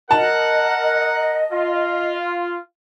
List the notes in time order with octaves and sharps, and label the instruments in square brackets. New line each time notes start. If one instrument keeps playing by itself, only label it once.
[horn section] A#4 F#5 [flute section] D#5 [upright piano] A5
[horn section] F4